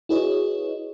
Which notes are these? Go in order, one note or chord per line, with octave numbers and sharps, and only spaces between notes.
E4 F#4 G#4 B4 C#5 D#5